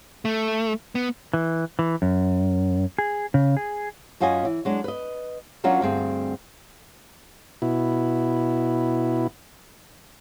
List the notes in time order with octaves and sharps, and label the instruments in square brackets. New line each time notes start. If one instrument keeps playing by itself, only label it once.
[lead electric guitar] A3
B3
[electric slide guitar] E3
E3
F#2
G#4
C#3
G#4
[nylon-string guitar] F#2 C#4 F4 F#4 D#5 G#5
E3
F#3 G#3 D4
B4 D#5
F#3 C#4 D4 F4 F#4 A#4
D2 G2 C4 G#4
[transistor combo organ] B2 E4